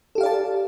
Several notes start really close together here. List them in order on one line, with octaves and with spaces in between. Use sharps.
A4 G4 F5 D5 A5